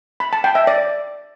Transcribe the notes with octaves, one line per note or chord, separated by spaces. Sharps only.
B5
A5
G5
E5
D5